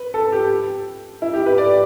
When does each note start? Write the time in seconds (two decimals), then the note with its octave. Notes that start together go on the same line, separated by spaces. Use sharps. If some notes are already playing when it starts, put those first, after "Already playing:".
Already playing: B4
0.14 A4
0.32 G4
1.22 E4
1.34 G4
1.46 B4
1.58 D5